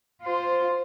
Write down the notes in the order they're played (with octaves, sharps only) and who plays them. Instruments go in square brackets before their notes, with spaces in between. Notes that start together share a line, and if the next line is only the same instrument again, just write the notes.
[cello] F4 C5